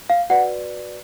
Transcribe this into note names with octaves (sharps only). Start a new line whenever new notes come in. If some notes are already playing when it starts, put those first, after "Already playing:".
F5
F#4 B4 D5 F#5